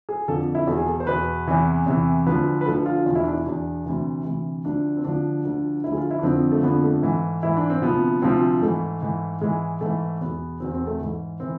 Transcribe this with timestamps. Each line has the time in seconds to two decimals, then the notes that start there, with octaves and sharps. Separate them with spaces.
0.09 G#4
0.28 F2 D3 F3 A4
0.55 E4
0.67 E2 B2 A4
0.78 G#4
0.87 A4
1.00 C5
1.07 E2 B2 B4
1.47 E2 C3 E3
1.86 E2 C3 E3
2.26 D2 D3 F3 B4
2.61 B4
2.66 D2 D3 F3 A4
2.86 F4
3.06 E2 F4
3.11 B2 E4
3.24 D4
3.33 E4
3.45 E2 B2 D4
3.86 D2 C3 E3
4.24 D2 C3 E3
4.65 D2 D3 F3 D4
4.97 C4
5.04 D2 D3 F3 D4
5.44 D2 D3 F3
5.84 D2 D3 F3 E4
5.92 G#4
5.98 F4
6.11 E4
6.19 D4
6.23 F2 D3 F3 C4
6.52 A3
6.63 F2 D3 F3 B3
6.84 A3
7.02 G#2 E3
7.43 G#2 E3 E4
7.57 D4
7.70 C4
7.82 D2 C3 F3 B3
8.22 D2 C3 F3 C4
8.61 G#2 E3 A3
9.02 G#2 E3
9.41 G#2 E3 G#3
9.81 G#2 E3 A3
10.21 E2 B2 B3
10.60 E2 B2 C4
10.74 C4
10.87 A3
11.00 G#2 E3
11.40 E3 C4